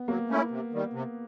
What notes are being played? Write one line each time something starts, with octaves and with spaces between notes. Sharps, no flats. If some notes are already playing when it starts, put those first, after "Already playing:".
Already playing: B3
F#3 A#3
A3 C#4 E4
C3
D#3 G3
C3